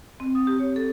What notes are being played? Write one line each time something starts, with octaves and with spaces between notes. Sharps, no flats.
C4
D#6
G4
C#5
A4